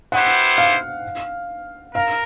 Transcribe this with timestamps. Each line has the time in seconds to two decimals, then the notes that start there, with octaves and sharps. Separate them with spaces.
0.12 B3 E4 G4 C5 F#5
0.58 F5
1.95 A#4 F5